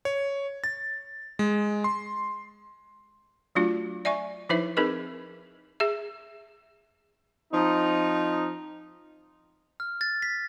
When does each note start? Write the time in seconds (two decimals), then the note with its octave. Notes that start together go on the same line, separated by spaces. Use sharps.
0.05 C#5
0.64 A6
1.39 G#3
1.84 C6
3.55 F#3 A3 D4 F4 F#4
4.05 D5 E5 G#5 C#6
4.49 F3 D#4 E4 B4 C5 E5
4.77 C4 D#4 G#4 A#4 B4 D#5
5.80 G#4 E5
7.53 F3 C4 D#4
9.80 F6
10.01 A6
10.22 B6